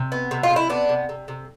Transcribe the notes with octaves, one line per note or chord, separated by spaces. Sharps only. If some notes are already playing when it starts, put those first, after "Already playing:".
Already playing: C3
B3
C3
F4
C3
E4
B3 D4
C3
C3
C3